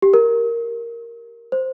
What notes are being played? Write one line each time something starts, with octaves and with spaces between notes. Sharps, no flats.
G4
A#4
C5